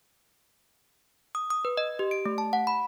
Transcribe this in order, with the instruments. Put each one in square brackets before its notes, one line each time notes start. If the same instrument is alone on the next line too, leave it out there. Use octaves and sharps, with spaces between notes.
[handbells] D#6
D#6
B4
D#5
G4
D7
A3
A5
F#5
B5